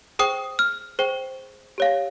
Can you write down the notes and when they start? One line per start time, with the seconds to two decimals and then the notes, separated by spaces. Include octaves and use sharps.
0.19 G#4 C5 G5 D#6
0.59 F6
0.99 G#4 C5 G5
1.78 G4 C#5 F5